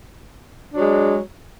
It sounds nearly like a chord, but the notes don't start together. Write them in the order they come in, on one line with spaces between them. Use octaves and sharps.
D4 F#3 G#3